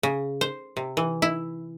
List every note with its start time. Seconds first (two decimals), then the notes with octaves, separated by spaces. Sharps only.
0.03 C#3
0.41 C5
0.77 C3
0.97 E3
1.22 E4